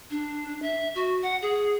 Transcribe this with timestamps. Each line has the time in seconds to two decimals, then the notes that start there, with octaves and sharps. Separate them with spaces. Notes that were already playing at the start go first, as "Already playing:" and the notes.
0.11 D4
0.62 E5
0.95 F#4
1.23 F#5
1.42 G#4